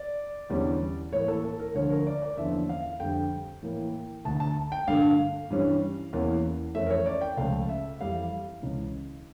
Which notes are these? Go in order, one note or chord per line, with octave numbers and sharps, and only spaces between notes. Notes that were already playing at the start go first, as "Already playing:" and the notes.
Already playing: D5
E2 D3 G3 C#4
A2 E3 A#3 C#5
A4
A4
A#4
D2 D3 F3 C#5
A#4
D5
D5
E2 D3 F3 A#3 C#4 E5
F5
F2 D3 G3 G5
A2 E3 A#3
D2 D3 A3 A5
A5
G5
G2 D3 A3 F5
G2 E3 G3 C#4
E2 E3 A#3 C#4
F2 E3 A3 C#4 E5
A#4
C#5
D5
G5
C#2 C#3 F3 A3 F5
E5
F2 E3 G3 F5
C#2 C#3 E3